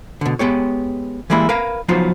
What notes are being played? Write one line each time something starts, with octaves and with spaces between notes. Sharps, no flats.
B2 D3
G#3 B3 G4 C#5
E3 G3 G#3 A#3 E4
A#4 B4 F5
F3 F#3 B3 D#4 F4 C5